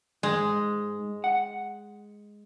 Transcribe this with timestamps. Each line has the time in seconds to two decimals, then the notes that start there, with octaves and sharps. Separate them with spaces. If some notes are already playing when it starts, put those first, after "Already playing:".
0.23 G#2 G#3
1.24 F#5